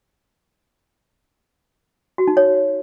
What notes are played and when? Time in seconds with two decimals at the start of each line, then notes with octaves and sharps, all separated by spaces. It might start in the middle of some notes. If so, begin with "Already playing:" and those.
2.18 F#4
2.28 D#4
2.37 C#5